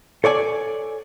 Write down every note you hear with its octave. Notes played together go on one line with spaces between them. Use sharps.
A4 C#5 D5 G#5